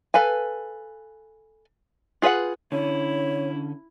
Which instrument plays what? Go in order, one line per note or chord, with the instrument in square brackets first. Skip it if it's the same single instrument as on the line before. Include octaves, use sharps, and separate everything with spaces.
[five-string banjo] A4 B4 F5 G#5
F4 G#4 B4 D#5 F#5
[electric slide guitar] D3 C#4 [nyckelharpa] E4 [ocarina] C#5